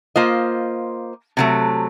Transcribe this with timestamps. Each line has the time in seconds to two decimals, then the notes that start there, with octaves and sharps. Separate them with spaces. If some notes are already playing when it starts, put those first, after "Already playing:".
0.16 A#3 F4 C5 D#5
1.37 C3 F#3 A3